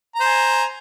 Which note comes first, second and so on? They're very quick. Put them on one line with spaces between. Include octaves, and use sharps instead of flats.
A#5 C5 G#5